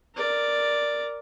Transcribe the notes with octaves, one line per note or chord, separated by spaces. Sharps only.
A#4 D5